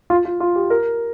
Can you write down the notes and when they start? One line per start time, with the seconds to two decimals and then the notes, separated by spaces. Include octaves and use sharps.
0.10 F4
0.25 F4
0.40 F4
0.56 G4
0.70 A#4